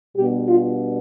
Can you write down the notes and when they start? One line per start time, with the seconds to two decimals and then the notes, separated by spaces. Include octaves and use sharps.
0.16 B2 G3 B3 D4 G4
0.48 F4